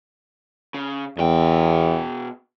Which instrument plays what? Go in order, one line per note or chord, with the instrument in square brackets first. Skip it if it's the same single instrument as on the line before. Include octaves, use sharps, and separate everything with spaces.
[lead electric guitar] C#3
[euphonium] E2 [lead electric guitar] B2 G5